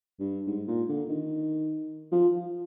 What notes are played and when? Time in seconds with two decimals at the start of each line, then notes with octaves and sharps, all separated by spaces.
0.20 G2
0.47 G#2
0.67 A#2
0.89 D3
1.09 D#3
2.12 F3